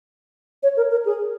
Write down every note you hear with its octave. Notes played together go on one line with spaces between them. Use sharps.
C#5
A#4
A#4
G#4